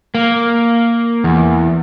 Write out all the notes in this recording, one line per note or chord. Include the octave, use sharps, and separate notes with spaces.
A#3
E2